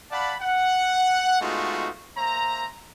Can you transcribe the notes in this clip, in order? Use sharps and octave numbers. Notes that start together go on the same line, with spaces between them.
D5 F5 F#5 A5 B5
F#5
G#3 A3 B3 D#4 F4 F#4
A#3 C5 E5 A#5